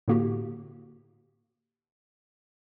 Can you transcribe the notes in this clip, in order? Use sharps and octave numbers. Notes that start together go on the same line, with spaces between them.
A2 D3 A#3 F#4 G4